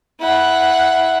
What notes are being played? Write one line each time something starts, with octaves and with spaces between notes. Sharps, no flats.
E4 F#5